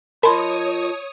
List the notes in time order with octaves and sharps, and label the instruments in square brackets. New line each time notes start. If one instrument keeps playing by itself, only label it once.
[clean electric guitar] F4 D#5 A5 [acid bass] A#4 [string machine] C#5 D#6 [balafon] B5 C6